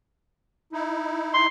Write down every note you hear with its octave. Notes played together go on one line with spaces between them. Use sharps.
D#4 E4
C6